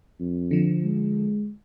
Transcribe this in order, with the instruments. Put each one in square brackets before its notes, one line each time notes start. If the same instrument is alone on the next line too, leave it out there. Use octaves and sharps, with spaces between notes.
[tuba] F2
[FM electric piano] D3 F3
[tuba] G#3